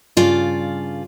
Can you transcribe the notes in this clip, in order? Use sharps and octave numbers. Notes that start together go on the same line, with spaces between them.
G2 C#3 F4 D5